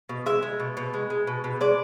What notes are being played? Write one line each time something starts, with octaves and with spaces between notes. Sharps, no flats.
B2
G#3 E5
G#3
B2
B2
G#3
G#3
B2
B2
G#3 D5